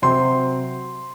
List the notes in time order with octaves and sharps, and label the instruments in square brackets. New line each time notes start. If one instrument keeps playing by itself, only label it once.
[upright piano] C3 F#3 C4 C6